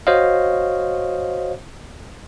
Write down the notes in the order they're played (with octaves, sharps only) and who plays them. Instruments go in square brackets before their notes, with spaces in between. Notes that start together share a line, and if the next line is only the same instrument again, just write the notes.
[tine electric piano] F#4 C5 C#5 D#5 F5